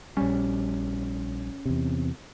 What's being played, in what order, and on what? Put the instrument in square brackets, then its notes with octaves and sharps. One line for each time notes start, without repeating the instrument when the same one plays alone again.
[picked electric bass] A#1 G3 [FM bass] C#4
[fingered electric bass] E2 C3